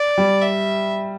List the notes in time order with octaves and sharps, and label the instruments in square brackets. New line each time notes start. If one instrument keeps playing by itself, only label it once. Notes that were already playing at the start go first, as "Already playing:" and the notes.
Already playing: [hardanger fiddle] D5
[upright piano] G3
[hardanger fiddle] E5